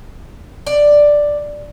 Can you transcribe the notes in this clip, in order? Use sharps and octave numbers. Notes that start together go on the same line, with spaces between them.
D5